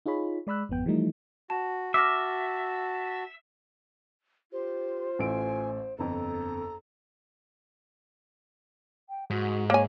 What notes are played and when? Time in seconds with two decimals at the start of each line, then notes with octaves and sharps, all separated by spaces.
0.06 D#4 F4 G#4 C#5 B5
0.47 G#3 D5 B5 E6 F#6
0.69 G#1 F2 B3 G5
0.86 E3 F3 G3 A3 D#4
1.50 F#4 A5
1.94 F#4 E5 A5 D6 F6 A#6
4.52 F4 G4 C5
5.19 A1 A3 G#5 D7
5.99 G1 F2 A4 A#5
9.09 G5
9.30 G#2 F#4
9.70 A#3 C#5 G#5